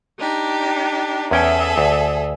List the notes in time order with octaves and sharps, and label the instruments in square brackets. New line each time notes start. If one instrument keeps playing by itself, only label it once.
[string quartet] D4 D#4 G4
[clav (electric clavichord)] E2 C#4 G5 [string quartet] G#4 A4 E5
[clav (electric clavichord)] D2